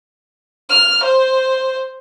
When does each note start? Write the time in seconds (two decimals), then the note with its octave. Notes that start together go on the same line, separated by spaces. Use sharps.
0.69 F6
1.03 C5